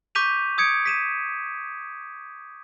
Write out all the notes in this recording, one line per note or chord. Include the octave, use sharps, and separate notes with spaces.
C#6 D6 G6 B6 D#7 F7
D#6 G#6 C#7 D7
B6 D#7 E7